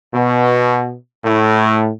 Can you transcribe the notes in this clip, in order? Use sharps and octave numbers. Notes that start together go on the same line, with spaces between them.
B2
A2